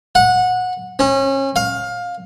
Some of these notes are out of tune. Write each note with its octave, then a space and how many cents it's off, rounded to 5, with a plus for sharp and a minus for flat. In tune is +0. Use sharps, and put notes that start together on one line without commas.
F#5 -20
C#4 -30
F5 +20